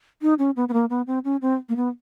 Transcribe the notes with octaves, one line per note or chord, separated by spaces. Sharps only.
D#4
C#4
B3
B3
A#3
B3
C4
C#4
C4
A#3
B3